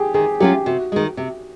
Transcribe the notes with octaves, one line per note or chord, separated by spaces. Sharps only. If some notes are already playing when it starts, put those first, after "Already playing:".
Already playing: G4 G#4
D#3 G#4
F#3 A3 C#4 F4 G4
C3 F#4
D#3 G#3
C3